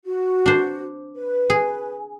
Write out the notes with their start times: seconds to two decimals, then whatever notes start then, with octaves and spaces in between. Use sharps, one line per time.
0.06 F#4
0.46 D4 C5
1.16 B4
1.50 G#4